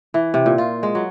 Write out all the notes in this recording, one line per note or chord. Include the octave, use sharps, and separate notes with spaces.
E3
C3
A#2
F4
G#3
F#3